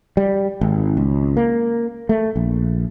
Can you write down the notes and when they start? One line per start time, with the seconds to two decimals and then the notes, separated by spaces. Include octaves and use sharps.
0.17 G3
0.61 G#1
0.97 C#2
1.37 A#3
2.09 A3
2.36 A#1